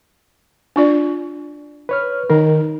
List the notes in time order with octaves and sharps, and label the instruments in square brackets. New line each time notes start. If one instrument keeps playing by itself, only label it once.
[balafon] D4 F4 D5
[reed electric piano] B4 C#5 F6
[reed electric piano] D#3 A#4 [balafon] D#4